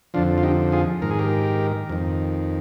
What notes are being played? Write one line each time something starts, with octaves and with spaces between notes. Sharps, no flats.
F2 D3 F3 D4 F4
F4
D#4 G4
F4 G#4
G#2 D#3 A#4
G#4
G4 A#4
F2 D#3